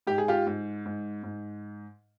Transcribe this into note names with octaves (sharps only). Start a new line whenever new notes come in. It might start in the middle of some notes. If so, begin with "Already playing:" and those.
G#2 G4
G#4
F4 G4
G#2
G#2
G#2